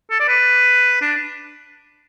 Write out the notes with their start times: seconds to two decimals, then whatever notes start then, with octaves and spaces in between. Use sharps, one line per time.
0.11 A4
0.20 D5
0.28 B4
1.02 D4